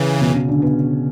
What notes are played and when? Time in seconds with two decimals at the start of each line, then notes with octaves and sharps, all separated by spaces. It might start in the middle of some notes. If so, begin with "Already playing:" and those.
Already playing: C#3 E3
0.21 B2 B3
0.34 C#3 C#4
0.48 D3 D4
0.62 B2 B3